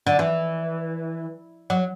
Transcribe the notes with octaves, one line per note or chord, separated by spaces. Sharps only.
D3
E3
F#3